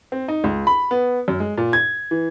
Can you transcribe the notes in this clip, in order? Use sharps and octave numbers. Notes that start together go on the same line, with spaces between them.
C4
D#4
C#2
B5
B3
F#2
G#3
A#2
G#6
E3